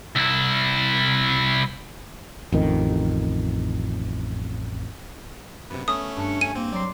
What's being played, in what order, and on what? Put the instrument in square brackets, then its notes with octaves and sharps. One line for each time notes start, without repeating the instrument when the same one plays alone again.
[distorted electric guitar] C2 E4
[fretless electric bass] A1 F2 D#3
[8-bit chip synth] F#2 C3 [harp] B3
[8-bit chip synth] A3 C#4 [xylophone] D#6
[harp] G2 C#7 [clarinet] D4
[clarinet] G#5 [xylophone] D#7
[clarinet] A#3 [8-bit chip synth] C4
[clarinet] F#3 [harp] D5 C6